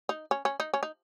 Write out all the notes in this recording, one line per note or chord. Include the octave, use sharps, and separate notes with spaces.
D#4
C#4
C#4
D#4
C#4
D#4